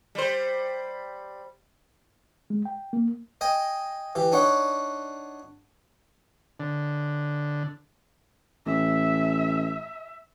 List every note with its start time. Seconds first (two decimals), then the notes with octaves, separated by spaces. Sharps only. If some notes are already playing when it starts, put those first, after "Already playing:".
0.15 G3 C5
2.50 G#3
2.65 G5
2.93 A#3
3.41 D#5 G5 G#5
4.15 E3 G4
4.32 D4 D#4 C#5 F#5
6.60 D3
8.66 A1 E5